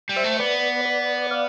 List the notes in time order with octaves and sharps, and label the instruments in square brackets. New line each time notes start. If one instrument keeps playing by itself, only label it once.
[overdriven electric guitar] G3
[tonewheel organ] C5 E5
[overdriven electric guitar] A3
[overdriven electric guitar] B3 [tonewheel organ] B4 D5
[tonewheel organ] B4 D5
D5 F5